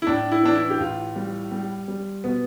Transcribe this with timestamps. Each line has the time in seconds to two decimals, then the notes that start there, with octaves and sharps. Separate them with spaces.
0.02 E4
0.07 A2 D4
0.32 E4
0.43 E3 D4
0.55 E4
0.70 G4
0.80 A2 F4
1.16 G3
1.52 G3
1.88 G3
2.24 B2 B3